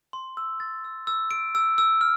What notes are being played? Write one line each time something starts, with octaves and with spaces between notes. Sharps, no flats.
C6
E6
A6
E6
E6
D7
E6
E6
F6